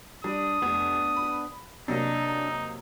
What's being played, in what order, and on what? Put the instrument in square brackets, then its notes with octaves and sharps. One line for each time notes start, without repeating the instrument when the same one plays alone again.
[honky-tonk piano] G3 [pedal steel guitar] D4 [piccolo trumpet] D#6
[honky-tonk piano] F1 [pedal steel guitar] B3 D4
[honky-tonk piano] B5
[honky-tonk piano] C3 F#3 A#3 [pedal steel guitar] D4 [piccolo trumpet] D#4